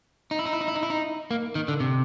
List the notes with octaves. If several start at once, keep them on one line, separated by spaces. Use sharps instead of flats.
D#4
E4
D#4
E4
D#4
E4
D#4
E4
D#4
A#3
D#3
D3
C3